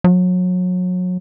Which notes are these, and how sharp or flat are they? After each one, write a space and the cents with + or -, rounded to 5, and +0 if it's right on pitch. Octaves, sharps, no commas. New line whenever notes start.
F#3 -30